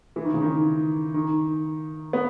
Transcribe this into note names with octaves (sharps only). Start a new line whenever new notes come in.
E3
D#3
C#3
D#3
D#3
B3